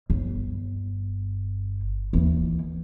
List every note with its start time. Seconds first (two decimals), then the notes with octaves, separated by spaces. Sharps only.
0.10 G1
2.13 D#2 E3